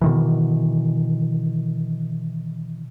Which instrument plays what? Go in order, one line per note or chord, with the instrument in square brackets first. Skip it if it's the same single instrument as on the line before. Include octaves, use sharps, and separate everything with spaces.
[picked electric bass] B2 D#3 E3